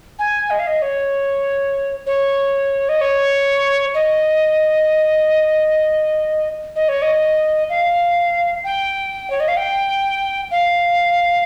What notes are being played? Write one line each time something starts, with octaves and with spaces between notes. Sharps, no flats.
G#5
D#5
F5
D#5
C#5
C#5
D#5
C#5
D#5
D#5
C#5
D#5
F5
G5
C#5
D#5
F5
G5
F5